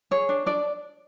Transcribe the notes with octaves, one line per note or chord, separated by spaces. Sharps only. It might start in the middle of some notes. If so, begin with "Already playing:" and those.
G#4 C#5
D4
D4 D5